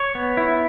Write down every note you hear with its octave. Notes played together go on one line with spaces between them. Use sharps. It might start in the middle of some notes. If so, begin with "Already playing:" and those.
Already playing: C#5
B3
E4